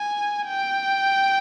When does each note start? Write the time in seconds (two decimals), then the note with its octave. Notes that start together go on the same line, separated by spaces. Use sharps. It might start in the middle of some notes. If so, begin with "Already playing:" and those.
Already playing: G#5
0.47 G5